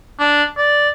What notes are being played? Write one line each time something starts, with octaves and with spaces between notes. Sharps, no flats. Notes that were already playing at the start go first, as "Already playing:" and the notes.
D4
D5